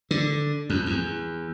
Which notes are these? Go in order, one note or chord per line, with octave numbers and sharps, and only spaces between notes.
D3
F2
E2